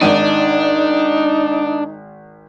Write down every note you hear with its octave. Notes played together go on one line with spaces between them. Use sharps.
G#1 D4 D#4 D#7